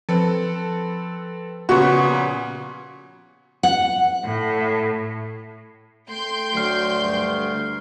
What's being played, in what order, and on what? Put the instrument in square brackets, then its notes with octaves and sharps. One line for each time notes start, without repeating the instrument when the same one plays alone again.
[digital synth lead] F3 [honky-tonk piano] C4 A4 B4
[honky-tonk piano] A#2 C#3 B3 [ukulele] F#4
[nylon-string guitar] F#5
[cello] A2
[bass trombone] A3 [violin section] G5 C6 G6
[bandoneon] D2 [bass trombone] F#3 [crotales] F6 C7
[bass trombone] G2